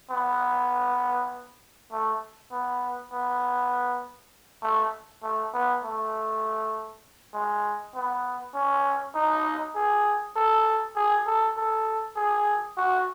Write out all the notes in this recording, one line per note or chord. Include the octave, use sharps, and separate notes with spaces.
B3
A3
B3
B3
A3
A3
B3
A3
G#3
B3
C#4
D#4
G#4
A4
G#4
A4
A4
G#4
F#4